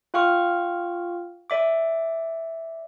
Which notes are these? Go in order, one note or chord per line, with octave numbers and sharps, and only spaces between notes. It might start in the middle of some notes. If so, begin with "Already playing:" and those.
F4 F5 G5 C#6 F6
D5 E5 D6